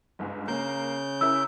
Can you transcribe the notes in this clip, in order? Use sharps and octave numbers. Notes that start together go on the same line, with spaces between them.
G1 C#2 G#2
C#3 A#3 G6
C#4 E4 A#4 E6